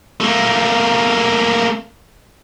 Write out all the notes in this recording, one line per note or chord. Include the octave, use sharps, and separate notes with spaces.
A3 A#3